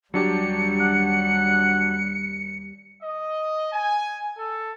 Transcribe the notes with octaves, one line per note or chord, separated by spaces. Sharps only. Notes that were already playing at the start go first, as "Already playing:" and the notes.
D#2 F#3 G3 D4 G4 C#7
F#5
D#5
G#5
A4